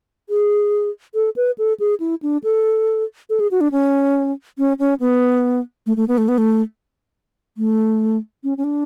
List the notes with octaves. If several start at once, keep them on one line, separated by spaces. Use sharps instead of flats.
G#4
A4
B4
A4
G#4
E4
D4
A4
A4
G#4
F#4
D4
C#4
C#4
C#4
B3
A3
A3
B3
A3
B3
A3
A3
C#4
C#4
D4